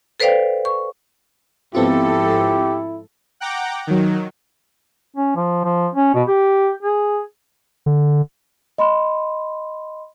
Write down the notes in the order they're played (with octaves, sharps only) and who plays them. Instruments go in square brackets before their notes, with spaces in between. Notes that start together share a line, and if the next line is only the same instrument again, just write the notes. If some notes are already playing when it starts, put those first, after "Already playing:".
[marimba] A4 B4 C5 D5 F5 G5
C#6
[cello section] G#2 F3 A4 [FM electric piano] B3 C4 F4 [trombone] E4 [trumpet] G4
[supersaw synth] F#5 G5 A#5 D6
D#3 F#3
[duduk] C#4
F3
F3
C#4
B2
G4
G#4
[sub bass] D3
[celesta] D#5 B5 C6